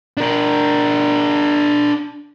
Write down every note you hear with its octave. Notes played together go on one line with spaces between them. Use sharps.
D4 A#4